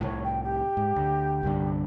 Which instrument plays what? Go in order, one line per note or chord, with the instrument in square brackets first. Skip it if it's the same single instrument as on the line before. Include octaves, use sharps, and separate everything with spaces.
[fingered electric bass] C2 A2 [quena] C#5
[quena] G5
G4
[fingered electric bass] G#2
D2
C2 G2 D3